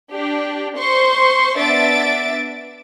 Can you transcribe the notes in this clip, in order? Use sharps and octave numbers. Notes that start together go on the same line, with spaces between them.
D4 G4
C5 C6 C#6
B3 D4 E5 A6 D7